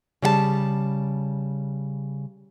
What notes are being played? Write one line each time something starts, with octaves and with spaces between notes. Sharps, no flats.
C#3 G3 F#5 A5